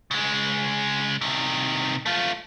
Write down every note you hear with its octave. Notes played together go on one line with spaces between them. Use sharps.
C#3 G#3
C3 D#3
A3 F4